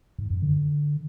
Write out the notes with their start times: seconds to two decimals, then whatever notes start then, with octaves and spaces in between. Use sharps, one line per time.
0.19 G#2
0.30 F#2
0.42 D3